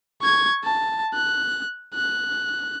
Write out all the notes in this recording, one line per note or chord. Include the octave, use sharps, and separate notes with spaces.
C#6 G#6
A5
F#6
F#6